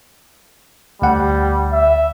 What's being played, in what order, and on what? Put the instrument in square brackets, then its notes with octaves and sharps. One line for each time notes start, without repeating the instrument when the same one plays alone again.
[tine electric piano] D2 F#5 [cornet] G3
[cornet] E5